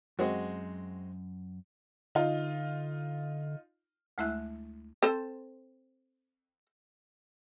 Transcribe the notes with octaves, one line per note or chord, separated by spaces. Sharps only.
F#2 G#3 C4 F#4
D3 D#4 F4
D2 G#3 A3 E4 E5 F#6
C4 A4 C5